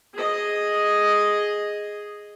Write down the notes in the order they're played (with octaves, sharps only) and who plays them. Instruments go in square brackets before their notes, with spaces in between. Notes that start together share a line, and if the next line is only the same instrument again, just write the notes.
[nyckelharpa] G#4 D#5